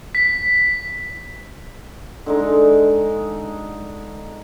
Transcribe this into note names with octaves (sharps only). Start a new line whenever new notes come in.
B6
D3 G#3 D#4